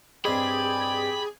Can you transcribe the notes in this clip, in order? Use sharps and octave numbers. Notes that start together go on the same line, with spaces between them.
G2 C4 G4 G#4 D5 D#5 G5 B5